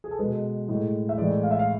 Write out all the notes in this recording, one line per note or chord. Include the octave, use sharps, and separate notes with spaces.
G#4
A4
B2 G#3 B4
A2 G#3
E5
A2 E3 G#3 D5
F5
E5
F5